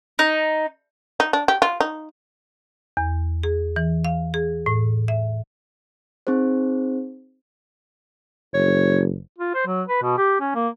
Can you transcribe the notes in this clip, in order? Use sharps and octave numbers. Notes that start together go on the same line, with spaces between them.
D#4
D#4
D4
G4
F4
D#4
E2
G#4
E3
F5
G#4
A2
E5
C4 D#4 G#4 C5
F#1 C#5
F4
C5
F#3
B4
B2
G4
C#4
A#3